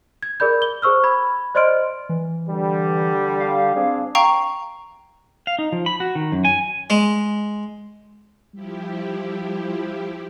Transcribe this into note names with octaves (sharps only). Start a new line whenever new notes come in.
G#6
G#4 A#4 D5 B5 G6
G7
G#4 C5 C#6 E6 F6
B5 G#6
C5 D5 D#5 C6 F6 D7
E3
D3 G3
F5
C4 D4 G#4
F5 G5 A#5 C#6
F5
D#4
F3
B5
F#4
D#3
F#2
G#5
G#3
F3 G3 E4 G4